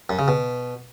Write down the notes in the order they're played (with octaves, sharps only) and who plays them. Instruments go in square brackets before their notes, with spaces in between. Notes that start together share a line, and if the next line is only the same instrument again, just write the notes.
[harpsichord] F#2
C#3
B2